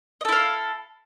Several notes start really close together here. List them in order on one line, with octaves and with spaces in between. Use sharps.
D#5 A4 E4 F5